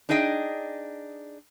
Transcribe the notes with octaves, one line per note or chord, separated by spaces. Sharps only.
D4 D#4 G#4 D#5 G5